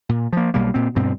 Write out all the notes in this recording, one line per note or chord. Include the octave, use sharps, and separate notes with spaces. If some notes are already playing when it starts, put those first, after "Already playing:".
A#2
F3 A#3
B1 B2 G3 A#3
A#2 C4
D2 G2 B2 C4